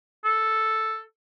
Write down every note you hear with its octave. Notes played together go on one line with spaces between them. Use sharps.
A4